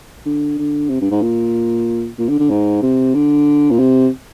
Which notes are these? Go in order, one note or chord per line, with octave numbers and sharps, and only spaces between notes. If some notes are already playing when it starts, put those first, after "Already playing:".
D3
D3
C3
G2
G#2
A#2
A#2
D3
D3
G#2
C3
D3
A#2
C3